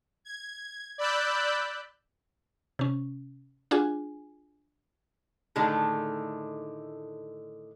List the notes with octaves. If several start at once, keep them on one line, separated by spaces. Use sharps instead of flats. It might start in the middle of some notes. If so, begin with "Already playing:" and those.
G#6
D5 B5 E6 F#6 G6
C3 C#4
D4 F4 F#4 G#4 G#5
A2 D3 D#3 G#3 A3 D4